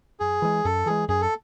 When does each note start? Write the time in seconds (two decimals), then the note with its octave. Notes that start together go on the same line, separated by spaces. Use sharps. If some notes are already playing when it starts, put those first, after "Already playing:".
0.20 F#2 G#4
0.42 E3 G#3
0.64 F#2 A4
0.86 E3 G#3 G#4
1.08 F#2 G#4
1.21 A4